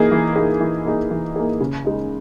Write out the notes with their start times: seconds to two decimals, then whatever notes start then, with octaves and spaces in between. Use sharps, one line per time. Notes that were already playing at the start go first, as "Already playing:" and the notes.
Already playing: E3 A#3 D#4 G#4
0.11 E3
0.36 A#3 D#4 G#4
0.60 E3
0.85 A#3 D#4 G#4
1.11 E3
1.36 A#3 D#4 G#4
1.61 C#3
1.85 G#3 D#4